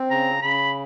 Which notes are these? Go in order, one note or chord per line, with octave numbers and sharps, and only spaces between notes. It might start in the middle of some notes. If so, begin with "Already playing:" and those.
Already playing: C4
C#3 A#5
C#3 B5